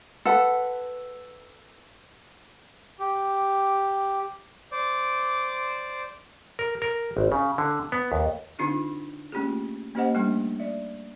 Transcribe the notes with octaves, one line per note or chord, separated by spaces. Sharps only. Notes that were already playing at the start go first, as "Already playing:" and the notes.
A4 B4 F#5
G4
C5 D5 D6
A#4
A#4
G#1
C#3
D3
B3
D#2
D3 C4 D4 D#4 F4 G#4
A3 A#3 C#4 F4 G4 G#4
A#3 C#4 G4 C5 D#5 F#5
G3 A3 A#3 D4
D5 E5